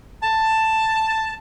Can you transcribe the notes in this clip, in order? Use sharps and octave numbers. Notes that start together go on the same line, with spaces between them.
A5